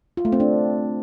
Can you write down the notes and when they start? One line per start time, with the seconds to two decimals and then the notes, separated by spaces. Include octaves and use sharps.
0.17 F4
0.25 A3
0.32 C4
0.40 D4